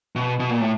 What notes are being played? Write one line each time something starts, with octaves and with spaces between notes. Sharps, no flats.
B2
B2
A#2
A2